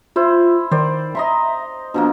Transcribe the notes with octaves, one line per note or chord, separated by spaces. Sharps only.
E4 F4 C5
D#3 C5 D5
D#5 E5 A#5 C6
B2 F3 A#3 D4